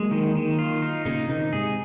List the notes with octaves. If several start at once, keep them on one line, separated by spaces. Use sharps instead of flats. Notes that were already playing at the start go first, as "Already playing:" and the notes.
Already playing: F#3 G#3 A#3
D#3
D#3
F4
D#4
A#2 C#3 D#4
C3 D#3 D#4
G#2 C3 G#4